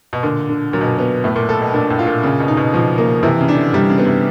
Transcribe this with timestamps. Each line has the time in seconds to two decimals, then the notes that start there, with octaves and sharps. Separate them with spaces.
0.13 B2
0.23 A#2 D3
0.49 D3
0.73 A#2 F#3
0.81 B2
0.87 A#2
0.98 B3
1.24 A2 A3
1.36 A#2
1.49 A#2 A4
1.61 B2
1.73 A#2 D4
1.90 A2
1.99 F4
2.07 A#2
2.23 A#2 C#3
2.40 B2
2.48 D#4
2.57 B2
2.74 B2 F3
2.98 A#3
3.23 C3 E3
3.41 C#3
3.48 D4
3.56 D3
3.73 C3 G3
3.90 C#3
3.98 B3
4.06 C3